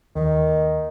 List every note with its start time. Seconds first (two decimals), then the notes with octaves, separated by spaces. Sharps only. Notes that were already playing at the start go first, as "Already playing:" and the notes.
0.15 D#2 D#3